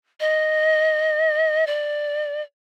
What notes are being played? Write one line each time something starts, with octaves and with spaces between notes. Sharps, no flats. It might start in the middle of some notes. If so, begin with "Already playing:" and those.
D#5
D5